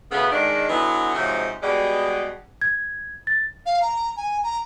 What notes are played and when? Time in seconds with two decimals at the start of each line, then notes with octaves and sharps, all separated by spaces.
0.11 D2 C#3 A3 B3
0.31 D#3 G#3 D4
0.68 D3 E3 F#3 B3
1.14 G#2 C3 F3 F#3 G#3 D#4
1.62 B2 G3 G#3
2.61 G#6
3.27 A6
3.66 F5
3.82 A#5
4.17 G#5
4.44 A#5